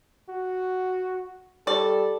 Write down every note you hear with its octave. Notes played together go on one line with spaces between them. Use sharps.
F#4
G3 A4 D5